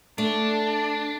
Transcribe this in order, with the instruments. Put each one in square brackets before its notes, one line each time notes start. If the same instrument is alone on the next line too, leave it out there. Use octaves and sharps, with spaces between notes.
[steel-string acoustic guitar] A3 [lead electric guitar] D4 [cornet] A5